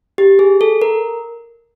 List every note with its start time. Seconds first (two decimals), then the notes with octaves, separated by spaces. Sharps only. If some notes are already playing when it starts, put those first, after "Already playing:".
0.18 G4
0.39 G#4
0.61 A4
0.82 A#4